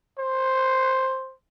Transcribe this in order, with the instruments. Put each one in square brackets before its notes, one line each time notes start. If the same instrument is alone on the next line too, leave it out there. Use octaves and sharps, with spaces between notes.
[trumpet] C5